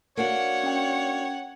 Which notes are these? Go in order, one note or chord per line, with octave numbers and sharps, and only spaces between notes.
A#3 D4 F#4 C#5 F#5
C#4 G5